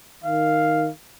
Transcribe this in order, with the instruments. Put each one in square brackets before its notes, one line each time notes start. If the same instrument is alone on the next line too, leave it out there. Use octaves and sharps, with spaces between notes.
[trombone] D#3 [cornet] F5